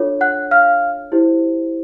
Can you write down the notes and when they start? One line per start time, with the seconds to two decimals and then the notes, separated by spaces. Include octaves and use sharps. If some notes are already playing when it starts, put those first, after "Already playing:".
Already playing: D4 F4 A4 C#5
0.21 F#5 F#6
0.51 F5 F6
1.12 E4 G4 C5